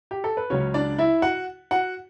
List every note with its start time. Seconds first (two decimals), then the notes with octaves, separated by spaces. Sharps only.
0.11 G4
0.24 A4
0.37 B4
0.50 C#2 C#3 F#3 C#4 C#5
0.74 D4 D5
0.99 E4 E5
1.22 F#4 F#5
1.71 F#4 F#5